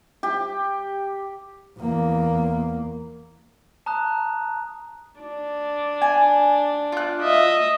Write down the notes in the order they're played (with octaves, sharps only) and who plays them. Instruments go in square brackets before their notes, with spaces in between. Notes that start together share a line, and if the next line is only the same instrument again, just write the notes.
[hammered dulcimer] G4
[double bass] E2 A#3
[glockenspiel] A5 A#5 D#6 F#6
[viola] D4
[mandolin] G#5
F4 F#6
[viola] D#5 E5